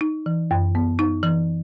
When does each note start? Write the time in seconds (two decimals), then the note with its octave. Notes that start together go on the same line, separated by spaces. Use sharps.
0.01 D#4
0.26 E3
0.51 F#2
0.75 B3
0.99 D#4
1.23 E3